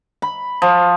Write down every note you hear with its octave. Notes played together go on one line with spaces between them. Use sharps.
B5
F3